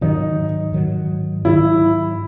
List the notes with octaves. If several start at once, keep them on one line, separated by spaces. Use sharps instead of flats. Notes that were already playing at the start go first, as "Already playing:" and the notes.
G#2 D#3 F#3 D#4
G#2 D#3 F#3
G#2 D#3 F#3 E4